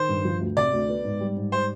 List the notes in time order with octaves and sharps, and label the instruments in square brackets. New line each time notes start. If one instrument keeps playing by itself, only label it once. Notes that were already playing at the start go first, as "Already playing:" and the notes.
Already playing: [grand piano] D#3 [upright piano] C5
[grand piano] G2
F3
D2
[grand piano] C3 [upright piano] D5
[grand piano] D2
B3
G#2
G3
G#2
[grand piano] G3 [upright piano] C5